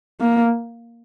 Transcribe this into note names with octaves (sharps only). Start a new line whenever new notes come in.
A#3